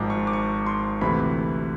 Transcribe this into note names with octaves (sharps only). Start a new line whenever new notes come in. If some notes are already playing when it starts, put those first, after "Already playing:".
Already playing: G#1 G#2 F3 G#3 D6
C#6
D6
C#6
C6
D2 C3 E3 B5